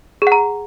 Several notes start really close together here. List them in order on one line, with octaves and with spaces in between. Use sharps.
G#4 F#5 A#5